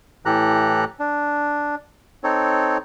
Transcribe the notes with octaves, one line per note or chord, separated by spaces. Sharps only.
A2 E3 G4 A4 A#5 F#6
D4
C4 D#4 A4 C#5